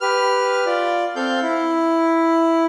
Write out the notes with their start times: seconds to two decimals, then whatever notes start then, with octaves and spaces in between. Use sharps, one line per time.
0.01 G4 B4 F6
0.66 F4 D5
1.16 C4 A4 F5 G6
1.42 E4